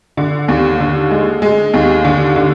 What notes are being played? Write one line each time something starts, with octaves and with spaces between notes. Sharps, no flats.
D3
D#2
D3
G#3
G#3
D#2
D3
D3